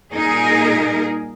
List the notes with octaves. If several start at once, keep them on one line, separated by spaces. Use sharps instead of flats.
A#2 G3 D#4 G#4 A#4